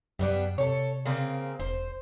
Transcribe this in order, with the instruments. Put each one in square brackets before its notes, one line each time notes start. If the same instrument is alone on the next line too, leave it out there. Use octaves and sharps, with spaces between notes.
[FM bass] F#2 [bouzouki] G3 B3 D4
[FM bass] C3 [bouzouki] A4 C#5
[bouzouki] C#3 A#3 C4
[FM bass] E1 [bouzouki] C5